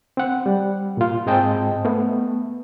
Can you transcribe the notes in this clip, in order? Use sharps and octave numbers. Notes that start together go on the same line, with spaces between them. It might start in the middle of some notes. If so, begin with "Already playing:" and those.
C4 F#5
G3
A#2 F4
G#2 G#3 C4 D#5 G5 A5
A3 B3